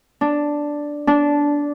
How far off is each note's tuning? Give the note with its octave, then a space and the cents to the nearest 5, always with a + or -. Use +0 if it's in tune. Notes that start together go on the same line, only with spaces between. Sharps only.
D4 +0
D4 -15